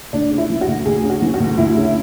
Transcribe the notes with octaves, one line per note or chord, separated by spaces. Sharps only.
D2 D4
C#3
E4
E3
F#4
D2
D2 G#4
C#3
F#4
E3
F#4
D2
D2 E4
C#3